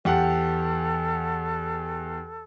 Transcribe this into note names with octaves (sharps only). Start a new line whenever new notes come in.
E2 G4 A4 F#5